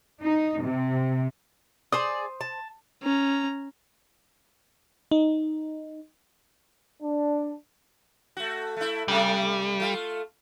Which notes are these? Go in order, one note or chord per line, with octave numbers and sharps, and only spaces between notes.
D#4
C3
G#4 C5 D5 D#6
A5
C#4 A#5
D#4
D4
A3 F#4
A3 E4
C3 G3 A3
A3 F4